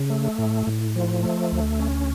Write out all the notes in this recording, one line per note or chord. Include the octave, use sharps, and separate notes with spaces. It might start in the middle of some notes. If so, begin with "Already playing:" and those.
Already playing: C#3
A3
A2
A2
F3
A3
D2
C#4